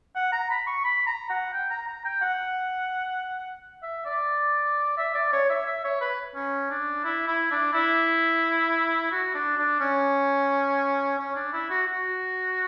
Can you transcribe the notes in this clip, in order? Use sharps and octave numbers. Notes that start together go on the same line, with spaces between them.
F#5
A#5
B5
C#6
B5
A#5
F#5
G5
A#5
A#5
G5
F#5
E5
D5
E5
D5
C#5
E5
E5
C#5
B4
C#4
D4
E4
E4
D4
E4
F#4
D4
D4
C#4
C#4
D4
E4
F#4
F#4